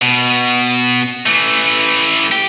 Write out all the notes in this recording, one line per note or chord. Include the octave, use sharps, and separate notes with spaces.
B2
E3 A3
G4